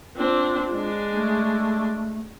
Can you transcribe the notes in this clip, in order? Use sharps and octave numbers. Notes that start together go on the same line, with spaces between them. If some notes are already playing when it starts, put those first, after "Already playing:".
C4 D4 F4
G#3 D4
A3